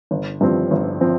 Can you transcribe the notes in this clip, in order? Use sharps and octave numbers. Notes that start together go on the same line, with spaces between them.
G1
G2 F3 C4
G1
F3 C4